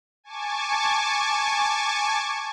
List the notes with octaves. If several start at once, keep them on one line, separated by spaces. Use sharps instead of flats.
G#5 A5 C#6 D6